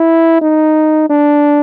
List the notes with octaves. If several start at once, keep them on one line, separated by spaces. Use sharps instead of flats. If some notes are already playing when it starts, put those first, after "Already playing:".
Already playing: E4
D#4
D4